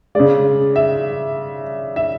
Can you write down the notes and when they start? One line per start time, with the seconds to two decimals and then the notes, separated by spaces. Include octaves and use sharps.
0.15 C#3 G#3 D5
0.76 E5
1.96 E5